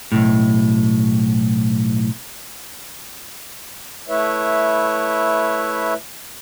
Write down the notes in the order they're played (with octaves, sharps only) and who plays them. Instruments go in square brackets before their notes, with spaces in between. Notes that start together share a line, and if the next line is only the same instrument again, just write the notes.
[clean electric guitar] B1 A2
[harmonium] A3 E4 B4 C#5 E5